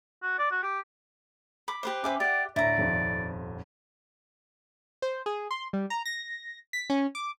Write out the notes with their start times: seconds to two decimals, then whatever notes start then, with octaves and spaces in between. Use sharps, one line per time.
0.22 F#4
0.38 D5
0.51 F#4
0.63 G4
1.68 B5 D6
1.83 G4 B4 C5
2.04 C#4 B4 C5 E5 G5 D6
2.20 G4 D5 F#5
2.56 D2 A2 E4 D5 A#5
2.78 D#1 G#1 F2
5.02 C5
5.26 G#4
5.51 C6
5.73 G3
5.90 A#5
6.06 A#6
6.73 B6
6.90 C#4
7.15 D6